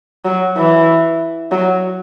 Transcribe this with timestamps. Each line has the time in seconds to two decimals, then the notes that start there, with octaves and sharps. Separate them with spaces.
0.25 F#3
0.57 E3
1.52 F#3